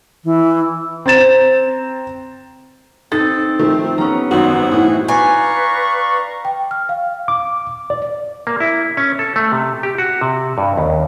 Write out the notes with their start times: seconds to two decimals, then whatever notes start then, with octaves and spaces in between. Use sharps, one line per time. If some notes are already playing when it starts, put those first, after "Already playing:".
0.25 E3
1.06 C4 A#5 A6 E7
3.12 C4 D#4 A4 A6
3.59 D#3 F3 A3
3.98 G3 B3 C#4 A#5
4.31 G#1 F#2 C4 D#4 F#4
4.71 A2 E3
5.08 B4 D5 F5 G#5 A#5 C#6
6.45 G5
6.71 F6
6.89 F5
7.28 D6
7.90 D5
8.47 A#3
8.60 E4
8.97 C#4
9.19 A4
9.36 A3
9.52 C3
9.83 G4
9.98 F#4
10.21 C3
10.58 G2
10.77 D#2